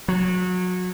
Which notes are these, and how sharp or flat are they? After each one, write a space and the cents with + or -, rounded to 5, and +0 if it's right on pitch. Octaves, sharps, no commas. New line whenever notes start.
F#3 -25